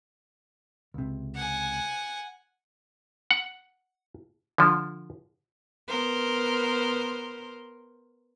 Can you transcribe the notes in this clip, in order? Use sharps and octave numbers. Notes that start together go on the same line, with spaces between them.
C#2 C3
F#5 G#5
F#5
D3 F3
B3 A#4 C5